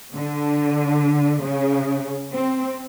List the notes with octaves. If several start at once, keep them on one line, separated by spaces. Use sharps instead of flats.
D3
C#3
C4